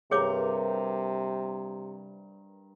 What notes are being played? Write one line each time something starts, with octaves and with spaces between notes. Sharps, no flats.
G2 C3 G#4 A#4 C#5 A#5 D6